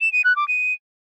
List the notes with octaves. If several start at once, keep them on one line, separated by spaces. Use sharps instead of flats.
E7
D#7
F#6
D6
D#7